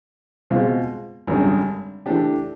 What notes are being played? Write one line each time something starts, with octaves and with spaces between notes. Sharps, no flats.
B2 G#3 C4 F4
G#1 F#2 D3 G3
E3 A3 D4 G4